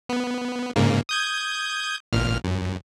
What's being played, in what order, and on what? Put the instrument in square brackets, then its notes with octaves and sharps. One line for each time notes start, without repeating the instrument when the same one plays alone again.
[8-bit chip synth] B3
G#2 C#3 A#3
D#6 G6 G#6
A1 A#2 F6
F#2